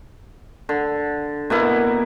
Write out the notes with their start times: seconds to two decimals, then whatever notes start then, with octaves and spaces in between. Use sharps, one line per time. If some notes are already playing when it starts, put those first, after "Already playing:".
0.69 D3
1.50 B2 A#3 E4